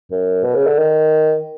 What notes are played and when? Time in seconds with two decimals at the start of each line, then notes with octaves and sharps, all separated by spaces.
0.11 F#2
0.44 B2
0.55 C#3
0.67 D3
0.78 D#3